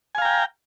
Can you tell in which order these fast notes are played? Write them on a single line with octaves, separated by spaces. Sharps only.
G#5 F5 A#5 G5